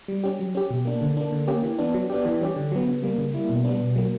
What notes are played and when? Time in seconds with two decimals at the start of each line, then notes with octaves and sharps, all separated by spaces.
0.08 G3
0.24 C#4 G4
0.39 F#3
0.55 C#4 G4
0.70 B2
0.85 A#3 D4
1.01 D3
1.17 A#3 D4
1.32 D3
1.47 A#3 C#4 G4
1.63 E3
1.78 B3 D4
1.94 F#3
2.10 B3 D4 G4
2.25 E3
2.41 G3 C#4 G4
2.56 D3
2.72 F#3 B3
2.87 C#3
3.03 G3 A#3
3.18 C#3
3.34 G3 A#3 E4
3.50 B2
3.65 G3 B3 D4
3.80 B2
3.96 F#3 A#3